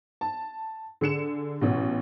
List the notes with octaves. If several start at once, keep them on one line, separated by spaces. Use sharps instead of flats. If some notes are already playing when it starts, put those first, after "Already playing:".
A5
D3 G#4 C#7 E7
A1 B2